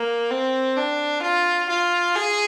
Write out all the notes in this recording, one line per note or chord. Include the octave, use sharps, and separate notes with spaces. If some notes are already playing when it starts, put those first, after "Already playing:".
Already playing: A#3
C4
D4
F4
F4
G#4